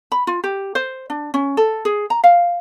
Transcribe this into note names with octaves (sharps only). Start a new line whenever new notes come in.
B5
F4
G4
C5
D4
C#4
A4
G#4
A#5
F5